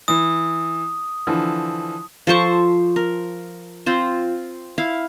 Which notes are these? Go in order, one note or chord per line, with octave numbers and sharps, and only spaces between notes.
E3 D#6
D3 E3 F3
F3 A4 C5 C#6
A#4
C4 F4 C5
E4 F5